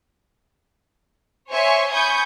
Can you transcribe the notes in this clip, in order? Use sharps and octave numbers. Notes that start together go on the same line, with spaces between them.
C5 C#5 E5 G#5 C6 C#6
G#5 B5 C#6 D#6 G6 G#6